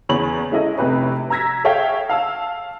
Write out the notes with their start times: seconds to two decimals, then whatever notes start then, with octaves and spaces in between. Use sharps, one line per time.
0.09 E2 C#3 C#5 B5 F#7
0.52 G#3 C#4 E4 A4 D#5
0.77 F1 C3 G4 B4 C#5
1.30 A#5 E6 G#6 A#6 B6
1.64 G#4 A4 C#5 E5 F5 G5
2.09 F5 A5 E6